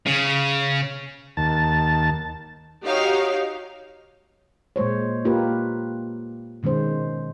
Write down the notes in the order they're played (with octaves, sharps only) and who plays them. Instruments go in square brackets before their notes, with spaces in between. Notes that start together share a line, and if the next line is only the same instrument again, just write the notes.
[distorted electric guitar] C#3
[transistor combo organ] D#2 A5
[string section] D#4 F#4 G4 C#5 F5
[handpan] A#2 G#3 C5 C#5
A#3 F4 G4 A#4 B4
B2 D#3 G#3 C#4 C5